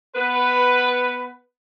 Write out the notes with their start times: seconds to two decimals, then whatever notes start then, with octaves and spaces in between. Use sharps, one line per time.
0.15 B3 B4